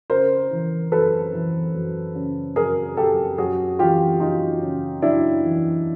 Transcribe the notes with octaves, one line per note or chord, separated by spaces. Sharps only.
C#3 A#4 C5
E3
F#2 A4 B4
E3
F#2
C#3
F#2 G#4 A#4
F#2 G4 A4
F#2 F#4 G#4
E3 F4 G4
F#2 D#4 F4
C#3
F#2 D4 E4
E3